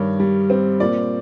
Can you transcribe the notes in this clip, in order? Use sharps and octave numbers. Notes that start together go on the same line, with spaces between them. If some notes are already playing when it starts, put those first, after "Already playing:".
Already playing: G2 D#3 C#5
G3
C4
A#2 D5